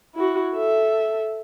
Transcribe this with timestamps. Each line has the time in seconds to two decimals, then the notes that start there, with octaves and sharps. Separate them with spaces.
0.15 E4 F#4
0.55 A4 E5